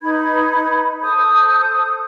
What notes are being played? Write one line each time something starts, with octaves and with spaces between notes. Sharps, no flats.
D#4 B4 B5 G#6
A4 C5 D#6 G6